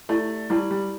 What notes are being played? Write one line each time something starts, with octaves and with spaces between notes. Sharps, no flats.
A3 E4 G4 D5 A5
G3 E4 G4 D5 A5
G3